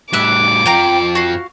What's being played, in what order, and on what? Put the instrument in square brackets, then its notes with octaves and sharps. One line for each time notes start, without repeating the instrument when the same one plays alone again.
[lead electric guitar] A2 G3 [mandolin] E5 E6 F#6 [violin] D6
[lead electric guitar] F2 F3 [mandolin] G5 A#5
[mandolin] F#4 F5